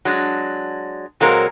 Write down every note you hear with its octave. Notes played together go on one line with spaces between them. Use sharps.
F#3 G#3 D4
A#2 F#3 G#3 A#3 C4 A#4